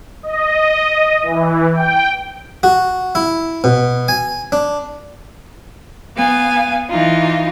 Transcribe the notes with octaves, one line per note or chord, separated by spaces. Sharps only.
D#5
E3
G5
F#4
E4
B2
G#5
D4
B3 F5 G#5
E3 D#4 F4